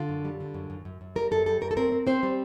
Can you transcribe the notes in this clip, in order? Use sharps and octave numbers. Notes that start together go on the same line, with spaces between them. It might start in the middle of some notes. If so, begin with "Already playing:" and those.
Already playing: D3 F4
F#2
G3
D3
F#2
F#2
F#2
F#2
G3 A#4
F#2 A4
G3 A4
F#2 A#4
A4
C4 A#4
C4
C4 C5
G3